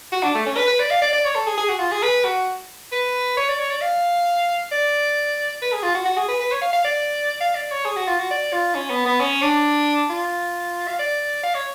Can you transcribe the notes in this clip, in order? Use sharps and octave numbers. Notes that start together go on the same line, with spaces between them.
F#4
D4
A3
C#4
B4
B4
D5
F5
D5
D5
C#5
A4
G#4
G#4
F#4
F4
G#4
B4
F#4
B4
C#5
D5
C#5
D5
F5
D5
B4
G#4
F4
F#4
F#4
G#4
B4
B4
C#5
F5
F5
D5
F5
D5
C#5
G#4
F#4
F4
F#4
D5
F4
C#4
B3
B3
C#4
D4
F4
F5
D5
F5
C#5